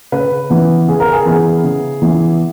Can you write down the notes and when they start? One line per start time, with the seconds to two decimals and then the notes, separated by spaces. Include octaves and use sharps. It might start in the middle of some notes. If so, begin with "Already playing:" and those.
0.12 C#3 B4
0.50 E3 B3
0.88 C#3 G#4
1.00 A#4
1.13 G#4
1.26 E3 B3
1.64 C#3
2.02 E3 B3